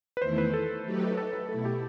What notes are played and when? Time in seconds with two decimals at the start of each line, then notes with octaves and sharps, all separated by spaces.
0.17 B4
0.21 E2 D#3 A3 E4 C5
0.38 B4
0.54 A4
0.85 F#3 A3 D#4 G4 B4
1.17 A4
1.33 B4
1.49 B2 A3 E4 A4
1.65 G4